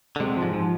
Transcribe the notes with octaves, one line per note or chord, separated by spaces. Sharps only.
D3
C3 G#3
F3
G#2
F3